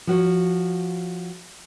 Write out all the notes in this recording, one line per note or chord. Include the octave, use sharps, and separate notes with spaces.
F3 F#4 C#5